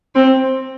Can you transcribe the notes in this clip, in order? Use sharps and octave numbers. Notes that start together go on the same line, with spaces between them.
C4